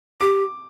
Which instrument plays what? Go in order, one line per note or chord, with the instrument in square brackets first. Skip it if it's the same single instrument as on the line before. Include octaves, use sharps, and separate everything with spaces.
[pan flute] G4 [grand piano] D6